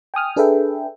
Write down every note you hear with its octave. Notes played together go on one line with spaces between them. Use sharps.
G5 G#5 D#6 F6
D4 G#4 A4 B4 E5 G5